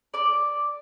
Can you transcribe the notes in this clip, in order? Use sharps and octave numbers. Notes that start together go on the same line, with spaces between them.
D5 D6